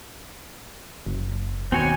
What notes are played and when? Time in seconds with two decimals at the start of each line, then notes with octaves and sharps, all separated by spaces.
1.06 F#1
1.72 D#2 B2 C4 F#4 C#5 G#5